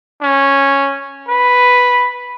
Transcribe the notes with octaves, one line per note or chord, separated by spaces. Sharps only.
C#4
B4